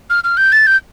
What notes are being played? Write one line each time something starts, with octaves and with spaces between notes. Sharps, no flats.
F6
F6
G6
A6
G6